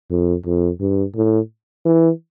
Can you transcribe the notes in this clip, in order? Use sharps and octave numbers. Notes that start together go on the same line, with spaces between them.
F2
F2
G2
A2
E3